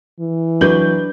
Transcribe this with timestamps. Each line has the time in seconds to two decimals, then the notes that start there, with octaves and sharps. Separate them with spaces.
0.20 E3
0.61 F#3 D4 B4 G6 F#7